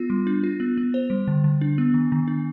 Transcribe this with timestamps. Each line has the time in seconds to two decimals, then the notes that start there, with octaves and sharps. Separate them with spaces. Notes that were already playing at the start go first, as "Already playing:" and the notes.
Already playing: B3 F4
0.10 G3
0.27 D4
0.44 F4
0.60 B3
0.78 B3
0.94 C5
1.10 G3
1.27 D3
1.44 D3
1.61 D4
1.78 B3
1.94 D#3
2.12 D#3
2.28 D4